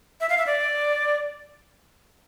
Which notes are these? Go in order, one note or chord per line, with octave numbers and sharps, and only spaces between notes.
E5
F5
E5
D5